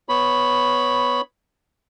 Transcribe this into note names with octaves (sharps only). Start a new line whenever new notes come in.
B3 C#5 B5